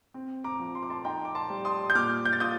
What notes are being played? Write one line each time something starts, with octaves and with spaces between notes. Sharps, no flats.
C4
A#5 D6
F3
C6
D6
A5 C6
D#4 G5 A#5
D6
A5 C6
G3
C6 D#6
G6
A#2 D6 F6
G6
A6
F4 D#6 G6